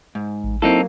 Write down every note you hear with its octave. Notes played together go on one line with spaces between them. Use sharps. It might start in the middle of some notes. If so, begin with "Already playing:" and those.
G#2
A1
F#3 A#3 C4 D#4 E4 A4